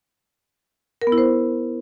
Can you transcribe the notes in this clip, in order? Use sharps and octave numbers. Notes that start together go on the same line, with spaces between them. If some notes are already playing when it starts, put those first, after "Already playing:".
A#4
B3
E4
C5